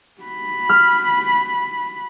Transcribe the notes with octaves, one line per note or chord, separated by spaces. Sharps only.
F#4 B5
F6